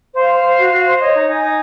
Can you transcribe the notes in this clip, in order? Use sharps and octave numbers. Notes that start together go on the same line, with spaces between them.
C5 F5
C5
C5
F#4
F#4
C5
C#5 D#5
D#4
D#4 G#5
D#4